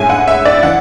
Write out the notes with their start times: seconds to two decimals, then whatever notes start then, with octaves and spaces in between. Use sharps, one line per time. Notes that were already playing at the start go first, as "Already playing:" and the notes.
Already playing: A2 G#3 C#4 E4 G#5
0.10 F#5
0.28 E5
0.45 D5
0.63 E3 F#5